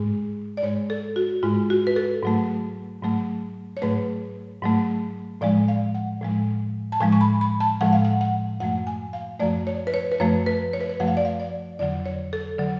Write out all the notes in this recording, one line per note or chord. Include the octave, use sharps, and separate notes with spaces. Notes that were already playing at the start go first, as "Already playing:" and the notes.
Already playing: G#2 G#3
D5
G#2 G#3 C#5
A4
F#4
G#2 G#3 F4
F#4
B4
A4
G#2 F#3 A3
G#2 F#3 A3
C#5
G#2 F#3 A3 B4
G#2 F#3 A3
A2 F3 G#3 D5
F5
F#5
A2 F3 G#3
A5
A2 F3 G#3 G#5
C#6
B5
B5
A5
A2 F3 G#3 F#5
F5
F#5
F#5
F#2 F3 A3 F#5
G#5
F5
F#2 F3 A3 D5
C#5
B4
C#5
B4
F#2 F3 A3 C#5
B4
C#5
B4
C#5
F#2 F3 A3 F#5
F5
D5
F5
D5
F2 D3 F#3 D5
C#5
A4
D3 F#3